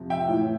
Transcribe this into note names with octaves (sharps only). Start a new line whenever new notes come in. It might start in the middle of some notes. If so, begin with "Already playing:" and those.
Already playing: F2 C3 F3
E5 G5
A2 E3